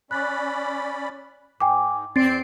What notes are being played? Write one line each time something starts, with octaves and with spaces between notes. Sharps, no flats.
C#4 D5 B5 F#6
G#2 G5 G#5 D6
E2 C4 D5 C6 A6 C7 D7